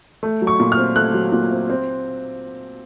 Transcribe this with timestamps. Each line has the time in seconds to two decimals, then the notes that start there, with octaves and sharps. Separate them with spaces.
0.23 A3
0.42 F#3
0.47 C#6
0.60 A#2
0.72 F6
0.78 C4
0.96 A3 F#6
1.14 F#3
1.32 A#2
1.51 C4
1.70 C4